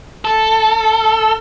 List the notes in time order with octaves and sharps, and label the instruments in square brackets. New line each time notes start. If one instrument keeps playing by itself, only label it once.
[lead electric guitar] A4